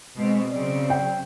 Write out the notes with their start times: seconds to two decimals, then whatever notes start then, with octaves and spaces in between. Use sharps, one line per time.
0.17 B2 G#3 C4
0.51 C#3 F#3 C4 D5
0.90 G5